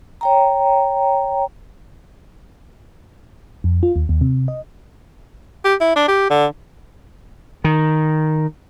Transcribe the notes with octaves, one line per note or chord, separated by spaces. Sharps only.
C#5 G5 A#5
F2
F4
D#2
D#2
C3
D#5
G4
E4
D4
G4
D3
D#3